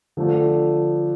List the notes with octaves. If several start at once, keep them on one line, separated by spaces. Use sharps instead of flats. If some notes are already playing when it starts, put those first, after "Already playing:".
D3 F3 A3 D4